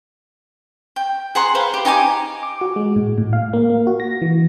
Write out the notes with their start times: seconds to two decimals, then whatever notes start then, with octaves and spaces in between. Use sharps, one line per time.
0.96 G5
1.35 G#4 F#5 A#5 C6
1.55 B4 C5 F5
1.74 G4
1.85 D#4 G4 G#5 D6
2.43 D6
2.61 F#4
2.76 G#3
2.96 A2
3.18 A2
3.33 F5
3.53 A#3
3.70 A#3
3.87 F#4
4.00 A#6
4.22 E3